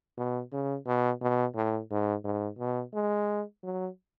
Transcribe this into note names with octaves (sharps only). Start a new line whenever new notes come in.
B2
C#3
B2
B2
A2
G#2
G#2
B2
G#3
F#3